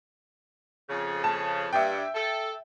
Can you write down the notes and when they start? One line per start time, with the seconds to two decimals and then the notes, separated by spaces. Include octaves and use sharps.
0.88 F2 C#3
1.24 A5
1.73 G2 E5 G5
2.14 A4